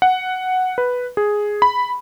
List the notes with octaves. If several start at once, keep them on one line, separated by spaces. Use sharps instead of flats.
F#5
B4
G#4
B5